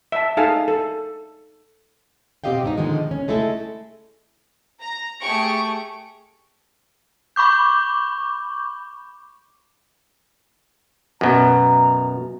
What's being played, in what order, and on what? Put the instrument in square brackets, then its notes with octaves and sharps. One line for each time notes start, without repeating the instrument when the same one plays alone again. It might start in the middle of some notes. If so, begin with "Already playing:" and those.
[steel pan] E5 A5
D#4 G#4 A4 F5 G#5 A5
A4
[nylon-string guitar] B2 C4 G4 D#5 F5 G5
G#2 B3 D4 D#4
A#2 D3 D#3 F3 G#3
C#4
G#3 A3 E4 A4
[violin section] A#5
A3 G4 G#4 C#6 D7
[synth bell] B5 C#6 D6 G6
[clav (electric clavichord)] F#2 B2 [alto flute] A#5